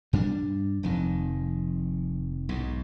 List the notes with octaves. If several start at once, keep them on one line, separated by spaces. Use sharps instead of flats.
G2 G3 D4
F1 F2 D#3
B1 G#2